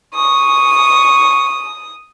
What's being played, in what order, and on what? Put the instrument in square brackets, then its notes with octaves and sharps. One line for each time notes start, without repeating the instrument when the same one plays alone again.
[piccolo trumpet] C#6 [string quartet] D#6